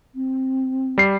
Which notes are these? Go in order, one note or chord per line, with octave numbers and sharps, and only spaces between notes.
C4
G3 C7